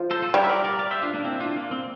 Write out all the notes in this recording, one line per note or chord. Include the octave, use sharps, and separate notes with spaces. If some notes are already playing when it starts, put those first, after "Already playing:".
Already playing: F3
A4 C5
F4 A4
G3 G4 A#4
E5
A#4 D5
A#4 D5
D5 F5
C5 E5
D4 F4
A#3 D4
C4 E4
D4 F4
A#3
C4